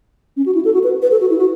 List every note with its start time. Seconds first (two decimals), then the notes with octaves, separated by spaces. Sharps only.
0.37 C#4
0.46 F#4
0.55 E4
0.65 A4
0.74 F#4
0.84 B4
1.02 B4
1.11 A4
1.21 F#4
1.30 E4
1.39 F#4